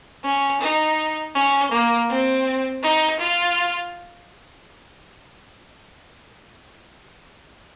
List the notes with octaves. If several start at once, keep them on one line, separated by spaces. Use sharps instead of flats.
C#4
D#4
C#4
A#3
C4
D#4
F4